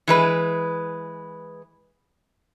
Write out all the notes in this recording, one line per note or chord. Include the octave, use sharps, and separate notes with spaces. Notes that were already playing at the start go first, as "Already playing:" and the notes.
E3 G#3 B4